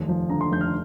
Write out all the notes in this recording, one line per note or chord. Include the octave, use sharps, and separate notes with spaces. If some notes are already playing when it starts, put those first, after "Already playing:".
Already playing: F1 D#2
F3
D3 A#5
C6
F1 G6
F6